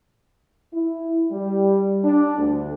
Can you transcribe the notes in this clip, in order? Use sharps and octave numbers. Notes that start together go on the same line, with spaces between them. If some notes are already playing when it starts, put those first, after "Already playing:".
E4
G3
D4
D2